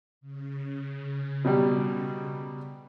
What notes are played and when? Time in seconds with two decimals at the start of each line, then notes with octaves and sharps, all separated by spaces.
0.21 C#3
1.44 B2 F#3 G3